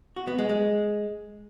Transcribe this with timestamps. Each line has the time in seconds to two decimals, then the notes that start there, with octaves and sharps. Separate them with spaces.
0.16 F#4
0.27 B3
0.38 G#3
0.49 G#3